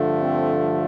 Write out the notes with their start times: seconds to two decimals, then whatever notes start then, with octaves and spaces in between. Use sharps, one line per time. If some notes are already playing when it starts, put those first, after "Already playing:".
Already playing: G2 D3 F3 A3
0.21 C4